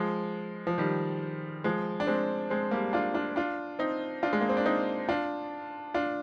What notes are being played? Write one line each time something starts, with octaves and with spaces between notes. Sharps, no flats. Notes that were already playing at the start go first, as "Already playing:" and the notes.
Already playing: F3 G#3
F3
D#3 G3
F3 G#3
D4
G#3 C4
G#3 C4
G3 A#3
D4 F4
D4 F4
D4 F4
C4 D#4
D4 F4
G#3
A#3
C4
D4
C4 D#4
D4 F4
D4 F4